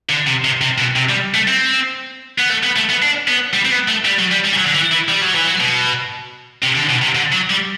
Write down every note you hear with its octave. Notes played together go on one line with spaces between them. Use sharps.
D3
C3
C3
C3
B2
C3
G3
A3
C4
B3
A3
B3
A3
B3
D4
B3
G3
C4
B3
A3
G3
F#3
G3
G3
E3
F#3
D3
E3
E3
G3
F#3
E3
F#3
B2
C3
D3
B2
C3
D3
F#3
G3